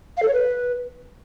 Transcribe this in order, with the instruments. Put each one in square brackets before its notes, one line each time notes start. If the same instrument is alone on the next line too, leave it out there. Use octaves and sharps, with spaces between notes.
[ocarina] F5
A4
C#5
B4